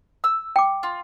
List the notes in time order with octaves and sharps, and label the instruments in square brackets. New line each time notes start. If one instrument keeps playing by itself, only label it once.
[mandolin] E6
[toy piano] G5 D6
[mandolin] F4